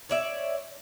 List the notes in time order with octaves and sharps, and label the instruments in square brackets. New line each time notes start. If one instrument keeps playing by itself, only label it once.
[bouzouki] C#5 D5 E5